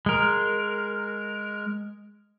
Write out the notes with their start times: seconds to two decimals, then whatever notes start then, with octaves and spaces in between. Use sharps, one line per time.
0.06 G#3 A#4